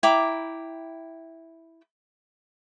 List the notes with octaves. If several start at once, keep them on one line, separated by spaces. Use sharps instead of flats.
E4 G5 A#5 D6